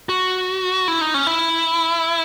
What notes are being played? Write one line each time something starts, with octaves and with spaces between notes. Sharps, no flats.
F#4
E4
D#4
C#4
E4